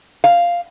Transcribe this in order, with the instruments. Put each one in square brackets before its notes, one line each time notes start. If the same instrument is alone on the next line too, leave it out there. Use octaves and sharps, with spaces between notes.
[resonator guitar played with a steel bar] F5